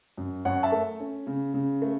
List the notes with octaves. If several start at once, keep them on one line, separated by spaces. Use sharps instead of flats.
F#2
F#2 C#5 F#5
E5 A5
A3
C#4
C#3
C#3
A3